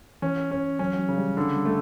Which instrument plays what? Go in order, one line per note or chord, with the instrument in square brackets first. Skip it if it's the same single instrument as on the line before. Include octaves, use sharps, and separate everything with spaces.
[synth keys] E3 [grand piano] C#4
[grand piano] C#4
[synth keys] F#3 [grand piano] C#4
[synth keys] F#3
[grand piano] C#3
[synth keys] G3
[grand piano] D3
[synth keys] G3
[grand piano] A3